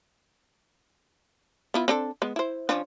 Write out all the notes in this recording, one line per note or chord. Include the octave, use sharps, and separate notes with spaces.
B3 E4 F4
C4 D4 A4
G#3 B3
E4 C5
F3 C#4 D4